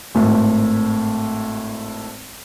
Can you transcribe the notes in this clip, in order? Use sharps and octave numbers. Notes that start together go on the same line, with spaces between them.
G#1 A2